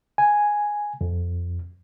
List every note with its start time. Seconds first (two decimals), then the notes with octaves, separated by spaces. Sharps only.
0.18 G#5
1.01 F2